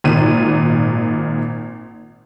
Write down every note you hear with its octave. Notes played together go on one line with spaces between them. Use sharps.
G#1 A#2 D#7